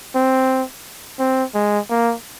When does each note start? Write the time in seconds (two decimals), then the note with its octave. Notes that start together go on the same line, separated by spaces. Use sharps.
0.15 C4
1.19 C4
1.55 G#3
1.90 A#3